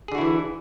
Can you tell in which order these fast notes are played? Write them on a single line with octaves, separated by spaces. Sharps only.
G#4 D3 F#4 E4 E3